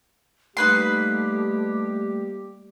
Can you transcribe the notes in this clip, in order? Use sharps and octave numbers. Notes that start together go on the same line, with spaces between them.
G3 A3 A#3 D#4 G4 B4 C6